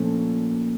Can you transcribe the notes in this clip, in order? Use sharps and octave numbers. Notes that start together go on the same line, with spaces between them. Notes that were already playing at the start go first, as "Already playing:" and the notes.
Already playing: A#2 F3 A3 C#4